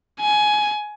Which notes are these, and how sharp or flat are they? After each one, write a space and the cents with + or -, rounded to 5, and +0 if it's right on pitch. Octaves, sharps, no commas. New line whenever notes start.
G#5 +20